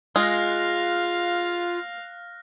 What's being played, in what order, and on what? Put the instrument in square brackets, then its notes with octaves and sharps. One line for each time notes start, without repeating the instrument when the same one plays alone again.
[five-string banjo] G#3 [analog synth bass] F4 [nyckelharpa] F5 [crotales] F6 F#6 A#6